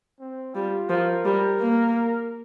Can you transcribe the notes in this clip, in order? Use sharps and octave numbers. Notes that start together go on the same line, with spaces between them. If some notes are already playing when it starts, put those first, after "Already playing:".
C4
G3 F4
F3 A#4
G3
A#3